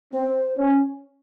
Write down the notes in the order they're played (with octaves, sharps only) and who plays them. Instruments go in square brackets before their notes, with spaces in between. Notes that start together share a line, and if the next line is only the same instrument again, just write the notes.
[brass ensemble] C4 [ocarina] C5
[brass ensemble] C#4